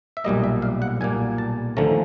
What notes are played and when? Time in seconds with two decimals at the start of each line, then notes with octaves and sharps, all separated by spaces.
0.17 E5
0.24 B1 A#2 G3 A#3 D#5
0.44 E5
0.62 F5
0.82 F#5
1.01 B1 A#2 G3 A#3 G#5
1.38 A5
1.77 D#2 D3 F3 A3 C#4 A#5